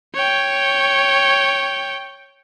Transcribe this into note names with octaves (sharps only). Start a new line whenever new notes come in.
C#5 G5